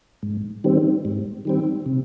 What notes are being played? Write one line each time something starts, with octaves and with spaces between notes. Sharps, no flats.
G#2
D#3 G3 C4
G#2
D#3 G3 C4
C3